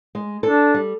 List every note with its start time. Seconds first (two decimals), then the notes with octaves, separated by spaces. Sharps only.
0.15 G#3
0.43 D4 A4
0.74 G3